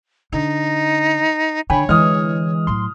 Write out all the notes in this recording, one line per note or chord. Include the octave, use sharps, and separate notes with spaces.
D3 D#4
D3 C#5 G5 G#5 B5
D3 E3 G#3 D#6 F6
A2 F#3 C6